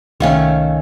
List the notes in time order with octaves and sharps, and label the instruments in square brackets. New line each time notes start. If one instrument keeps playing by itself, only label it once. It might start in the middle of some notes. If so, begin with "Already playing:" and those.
[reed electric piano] C2 F5 [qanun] D#3 A3 C#4